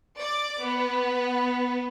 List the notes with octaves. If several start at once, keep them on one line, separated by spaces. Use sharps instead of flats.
D5 D6
B3